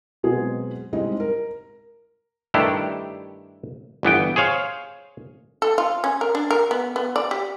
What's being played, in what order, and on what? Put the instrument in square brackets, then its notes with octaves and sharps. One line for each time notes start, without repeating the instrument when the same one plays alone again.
[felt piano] B2 F#3 G#3 B3 C4 G#4
G3 G#3 C4 D#4 E4 G4
A#4
[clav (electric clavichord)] G2 D#3 A3 D4 E4 G4
G1 E3 B3 G5
G#4 C5 C#5 F5
[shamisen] A4
F4
C#4
A#4
D4
A#4
B3
B3
D5
G4